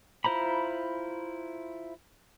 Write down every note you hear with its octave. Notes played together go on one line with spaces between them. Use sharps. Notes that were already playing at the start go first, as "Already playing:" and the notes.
E4 F4 C5 A#5 B5